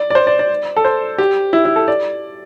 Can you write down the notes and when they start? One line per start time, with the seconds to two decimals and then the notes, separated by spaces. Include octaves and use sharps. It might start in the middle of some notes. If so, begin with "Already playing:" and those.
Already playing: D5
0.10 D5
0.15 C5
0.27 D5
0.39 D5
0.77 A4
0.85 C5
1.18 G4
1.53 E4
1.65 E4
1.76 A4
1.88 D5